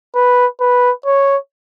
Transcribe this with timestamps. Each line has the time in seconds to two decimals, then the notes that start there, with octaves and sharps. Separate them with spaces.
0.15 B4
0.61 B4
1.06 C#5